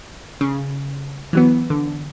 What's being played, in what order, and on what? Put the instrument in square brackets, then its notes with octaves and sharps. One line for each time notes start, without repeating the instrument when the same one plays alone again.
[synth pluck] C#3
E3 F#3 B3
D3